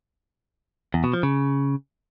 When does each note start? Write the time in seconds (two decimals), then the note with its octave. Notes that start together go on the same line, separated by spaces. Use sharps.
0.94 E2
1.04 B2
1.14 F3
1.23 C#3